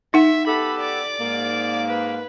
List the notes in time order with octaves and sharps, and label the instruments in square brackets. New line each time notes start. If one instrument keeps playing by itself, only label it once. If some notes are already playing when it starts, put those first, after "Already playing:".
[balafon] D#4 F#5 [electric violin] E5
[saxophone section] B3 G4 A4 [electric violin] B5
[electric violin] D5 D6
[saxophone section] G#2 A#3
[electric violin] B4